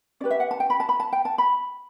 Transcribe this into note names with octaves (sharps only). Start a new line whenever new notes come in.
C#4 G4 B4 D5
E5
F#5
A5
G5
B5
A5
B5
A5
G5
A5
B5